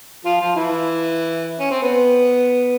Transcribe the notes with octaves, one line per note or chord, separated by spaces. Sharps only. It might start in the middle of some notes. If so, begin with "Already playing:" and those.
F3 F4
F3 F4
E3 E4
C#4
C4
B3